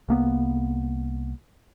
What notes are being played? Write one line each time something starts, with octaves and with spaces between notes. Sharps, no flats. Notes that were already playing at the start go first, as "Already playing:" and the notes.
C2 A#3 B3